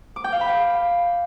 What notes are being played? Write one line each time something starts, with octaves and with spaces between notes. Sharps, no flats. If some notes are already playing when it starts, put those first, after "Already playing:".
D6
G5
F5
B5
G5